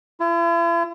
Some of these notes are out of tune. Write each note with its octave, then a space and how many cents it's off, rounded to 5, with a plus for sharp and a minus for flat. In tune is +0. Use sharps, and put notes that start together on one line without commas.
E4 +45